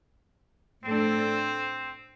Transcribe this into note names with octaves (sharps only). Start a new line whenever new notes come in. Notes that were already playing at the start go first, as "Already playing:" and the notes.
A2 A3 C4 D4 A4 C5